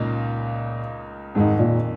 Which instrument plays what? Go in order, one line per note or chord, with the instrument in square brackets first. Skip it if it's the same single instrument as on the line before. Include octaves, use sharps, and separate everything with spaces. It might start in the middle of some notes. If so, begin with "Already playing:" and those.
Already playing: [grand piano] C#2 C#3 A#3 D#4 [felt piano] A#2
[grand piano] F2 D#3 G#3 [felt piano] G#2
[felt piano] A#2